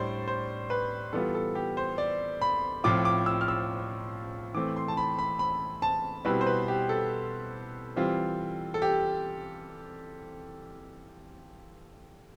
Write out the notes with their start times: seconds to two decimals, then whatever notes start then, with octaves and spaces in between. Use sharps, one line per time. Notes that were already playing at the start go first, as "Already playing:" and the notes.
Already playing: A2 G3 D4 C5 D5
0.28 C5
0.70 B4
1.13 E3 G3 B3 F4 A4
1.35 A4
1.55 G4
1.77 C5
1.98 D5
2.42 B5
2.84 A2 F3 C4 F4 D6
3.05 D6
3.26 E6
3.41 F6
3.48 E6
4.54 E3 A3 C4 D6
4.76 C6
4.88 A5
4.97 B5
5.18 B5
5.39 B5
5.82 A5
6.25 B2 G3 C4 E4 B4
6.41 C5
6.47 B4
6.68 G4
6.89 A4
7.96 E3 G3 C4 F4
8.74 A4
8.82 G4